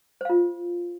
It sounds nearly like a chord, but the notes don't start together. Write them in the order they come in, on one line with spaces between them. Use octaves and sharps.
C5 F5 F4